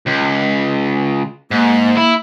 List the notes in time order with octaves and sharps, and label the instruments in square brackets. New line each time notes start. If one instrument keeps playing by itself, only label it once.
[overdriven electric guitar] C#2
[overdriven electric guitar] G#2 [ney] A#3
[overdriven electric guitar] E4